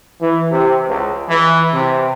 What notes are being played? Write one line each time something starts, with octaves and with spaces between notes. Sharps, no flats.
E3
C3
C#2
E3
C3